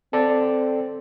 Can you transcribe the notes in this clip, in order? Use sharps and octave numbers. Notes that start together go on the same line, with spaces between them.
C4 A4 D5